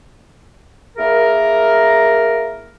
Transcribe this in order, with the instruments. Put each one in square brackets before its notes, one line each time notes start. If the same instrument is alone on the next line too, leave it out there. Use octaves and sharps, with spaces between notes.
[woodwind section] A#3 E4 G#4 A#4